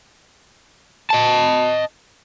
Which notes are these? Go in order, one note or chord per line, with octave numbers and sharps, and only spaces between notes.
D#5 A5